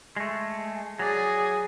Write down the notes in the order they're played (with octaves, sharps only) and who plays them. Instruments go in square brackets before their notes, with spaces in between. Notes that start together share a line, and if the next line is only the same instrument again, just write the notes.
[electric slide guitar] G#3 A3
[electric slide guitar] F#3 D5 [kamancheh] G#4